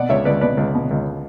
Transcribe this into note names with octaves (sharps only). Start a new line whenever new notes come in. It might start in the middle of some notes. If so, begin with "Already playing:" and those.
Already playing: B2 D5 F#5
C#2 C#5 E5
C#2 B4 D5
B2 B4 D5
C#2
B2
C#2